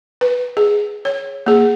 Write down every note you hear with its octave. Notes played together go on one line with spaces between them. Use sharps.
B4
G#4
C#5
A#3 G#4